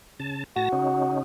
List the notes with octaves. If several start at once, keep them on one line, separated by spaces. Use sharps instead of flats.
C#3 A5
A2 F#4 A5 A#6
C#3 C#4 D#4